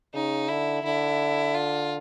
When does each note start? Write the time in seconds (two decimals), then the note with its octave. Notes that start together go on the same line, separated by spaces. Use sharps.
0.13 C#3 D#4
0.48 D3 E4
0.83 D3 E4
1.54 F4